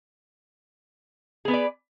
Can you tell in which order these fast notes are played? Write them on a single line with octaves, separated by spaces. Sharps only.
G#4 B3 B4 D5